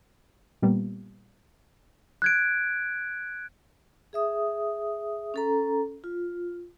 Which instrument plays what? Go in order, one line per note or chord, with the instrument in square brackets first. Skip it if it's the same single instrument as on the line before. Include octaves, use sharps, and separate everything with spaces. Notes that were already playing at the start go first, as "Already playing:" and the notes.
[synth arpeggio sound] A#2 G3 A#3 B3
[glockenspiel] F#6 G#6 D7
[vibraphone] G#4 E5 D#6
C#4 A4 A#5
F4